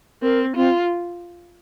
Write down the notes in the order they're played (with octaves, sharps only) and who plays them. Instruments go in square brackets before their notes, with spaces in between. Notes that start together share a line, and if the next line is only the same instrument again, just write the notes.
[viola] C4 [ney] A#4
[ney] C4 [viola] F4